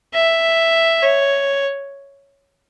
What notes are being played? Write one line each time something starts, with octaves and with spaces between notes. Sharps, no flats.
E5
C#5